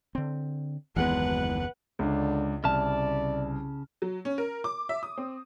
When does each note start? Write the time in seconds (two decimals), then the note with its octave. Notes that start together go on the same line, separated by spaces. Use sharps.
0.15 D3 C4
0.96 F#1 D#2 E3 G#3 B3 B4 F#5
1.99 C#2 D3 D4
2.64 C2 C#3 D5 A5 F6
4.02 F#3
4.25 C#4
4.38 A#4
4.64 D6
4.89 E5
5.03 D#6
5.17 C4